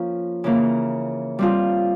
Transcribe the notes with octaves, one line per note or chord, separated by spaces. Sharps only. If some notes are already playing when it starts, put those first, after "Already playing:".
Already playing: F3 A#3 C#4 F4
C#3 E3 A#3
G3 C4 F4